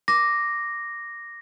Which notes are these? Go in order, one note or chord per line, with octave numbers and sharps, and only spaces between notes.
D6 A#6